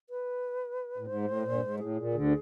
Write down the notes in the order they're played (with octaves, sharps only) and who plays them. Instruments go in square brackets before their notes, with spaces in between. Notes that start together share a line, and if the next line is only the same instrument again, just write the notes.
[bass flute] B4
[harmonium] A2
[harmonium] G#2 [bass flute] C5
[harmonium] A2
A#2
G2
G#2
[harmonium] A2 [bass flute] G#4
[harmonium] A#2
D2 D3